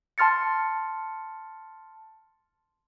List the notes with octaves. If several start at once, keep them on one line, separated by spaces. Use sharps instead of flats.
A5 C6 F6 A6 C#7